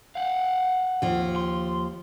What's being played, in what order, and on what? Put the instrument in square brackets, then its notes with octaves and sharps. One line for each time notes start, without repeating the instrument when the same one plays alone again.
[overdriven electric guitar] F5 F#5
[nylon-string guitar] D#2 F3
[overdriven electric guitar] C6